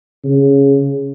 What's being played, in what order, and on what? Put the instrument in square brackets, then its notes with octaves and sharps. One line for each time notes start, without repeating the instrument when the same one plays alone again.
[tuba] C#3